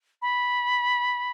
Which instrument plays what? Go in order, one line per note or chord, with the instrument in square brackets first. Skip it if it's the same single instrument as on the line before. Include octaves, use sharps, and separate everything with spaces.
[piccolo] B5